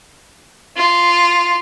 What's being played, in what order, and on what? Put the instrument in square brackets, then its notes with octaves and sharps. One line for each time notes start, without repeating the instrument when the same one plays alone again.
[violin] F4